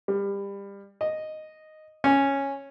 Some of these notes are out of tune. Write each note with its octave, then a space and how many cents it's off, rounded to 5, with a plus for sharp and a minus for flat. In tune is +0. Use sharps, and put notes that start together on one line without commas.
G3 +25
D#5 -5
C#4 -5